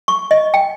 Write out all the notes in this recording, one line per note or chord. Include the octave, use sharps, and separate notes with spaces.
C#6
D#5
G5